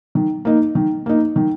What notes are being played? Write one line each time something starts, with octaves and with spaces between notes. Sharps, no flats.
D#3
A#3 D#4
D#3
A#3 D#4
D#3